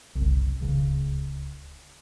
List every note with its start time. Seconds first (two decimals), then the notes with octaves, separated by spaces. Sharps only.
0.15 F#1 C2
0.60 D1 C#2 C#3